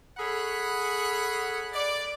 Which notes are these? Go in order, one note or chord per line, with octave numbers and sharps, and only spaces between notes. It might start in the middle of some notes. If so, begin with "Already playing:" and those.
G#4 A4 C#5 F#5 B5
D5